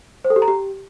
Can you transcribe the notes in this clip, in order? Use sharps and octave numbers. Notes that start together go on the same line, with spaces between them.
C5
A4
G4
A#5
G4